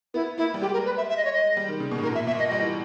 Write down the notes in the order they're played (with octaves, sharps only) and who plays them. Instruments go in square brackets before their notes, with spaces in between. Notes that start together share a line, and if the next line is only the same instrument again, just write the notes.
[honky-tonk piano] B3 [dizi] E4
[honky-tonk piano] A#3 [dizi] E4
[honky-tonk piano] G3
[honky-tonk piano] G#3 [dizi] G4
[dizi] A#4
B4
E5
E5
D#5
C#5
D#5
[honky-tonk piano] G3
D#3
C#3
B2
G#2
[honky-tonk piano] A#2 [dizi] A#4
[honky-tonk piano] A#2 [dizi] E5
[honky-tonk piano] B2 [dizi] E5
[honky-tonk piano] A#3 [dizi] D#5
[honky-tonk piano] G3 [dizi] D#5
[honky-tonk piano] E3